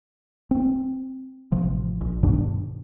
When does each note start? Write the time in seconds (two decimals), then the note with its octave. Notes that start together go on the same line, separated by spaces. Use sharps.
0.51 C4
1.52 A1 C3 F3
2.01 A#1
2.23 G2 B2 D#3 D4